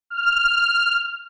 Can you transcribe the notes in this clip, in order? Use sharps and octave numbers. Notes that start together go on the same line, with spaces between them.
F6